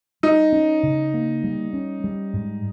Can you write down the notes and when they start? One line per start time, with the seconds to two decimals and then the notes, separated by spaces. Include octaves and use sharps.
0.23 G3 D#4
0.53 C#4
0.83 C#3
1.14 A#3
1.44 G3
1.73 C#4
2.04 G3
2.33 G#2